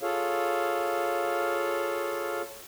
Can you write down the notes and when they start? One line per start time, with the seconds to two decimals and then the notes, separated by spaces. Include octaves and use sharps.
0.02 F4 G#4 A4 C#5 F5